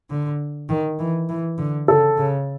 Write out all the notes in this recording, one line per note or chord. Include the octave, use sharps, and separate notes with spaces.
D3
D#3
E3
E3
D3
C#3 A4
C#3